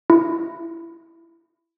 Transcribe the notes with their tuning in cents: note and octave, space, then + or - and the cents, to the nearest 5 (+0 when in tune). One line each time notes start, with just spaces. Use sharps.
E4 +20